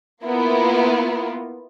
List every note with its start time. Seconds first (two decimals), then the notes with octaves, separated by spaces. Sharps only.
0.24 A#3 B3 E4 F4 A#4